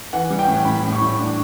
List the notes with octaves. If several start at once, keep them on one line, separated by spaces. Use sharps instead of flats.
E3 F#5
G3
G5
A2
A2 B5
A2
C#6
A2
D4